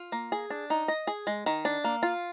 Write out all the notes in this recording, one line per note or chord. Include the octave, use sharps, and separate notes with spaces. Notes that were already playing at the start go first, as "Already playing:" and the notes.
Already playing: F4
A#3
G#4
D4
D#4
D#5
G#4
G#3
D#3
D4
A#3
F4